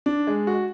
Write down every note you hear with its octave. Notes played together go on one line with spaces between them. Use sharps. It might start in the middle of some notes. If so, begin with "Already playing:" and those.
D4
G#3
F#4